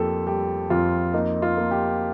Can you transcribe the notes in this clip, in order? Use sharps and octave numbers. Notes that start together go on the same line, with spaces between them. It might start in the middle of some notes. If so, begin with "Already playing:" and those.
Already playing: F2 A#3 G4 A4
G3 G4
F2 F4
A#3 D#4
F4
A#3
G4